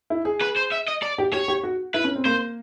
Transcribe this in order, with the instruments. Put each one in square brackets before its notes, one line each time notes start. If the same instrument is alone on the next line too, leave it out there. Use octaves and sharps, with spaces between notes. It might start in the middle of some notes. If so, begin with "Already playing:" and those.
[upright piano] E4
G#4
[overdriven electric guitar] B4
C5
E5
D#5
D5
[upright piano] G4
[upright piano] G4 [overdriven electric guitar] C#5
[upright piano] G4
F#4
[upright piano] E4 [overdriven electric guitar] B4
[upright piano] C#4
C4
[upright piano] A#3 [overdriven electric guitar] C5